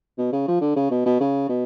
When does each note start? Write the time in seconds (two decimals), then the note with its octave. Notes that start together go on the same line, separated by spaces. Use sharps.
0.18 B2
0.33 C#3
0.48 F3
0.61 D3
0.76 C#3
0.91 B2
1.05 B2
1.20 C#3
1.49 B2